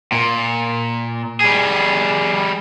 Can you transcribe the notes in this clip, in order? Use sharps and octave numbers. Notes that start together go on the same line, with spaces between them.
A#2
G3 G#4